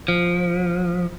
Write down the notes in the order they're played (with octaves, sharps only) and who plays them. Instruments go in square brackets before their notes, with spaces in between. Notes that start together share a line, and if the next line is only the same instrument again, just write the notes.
[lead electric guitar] F3